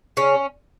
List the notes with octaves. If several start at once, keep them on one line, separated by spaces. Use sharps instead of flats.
C#3 C#4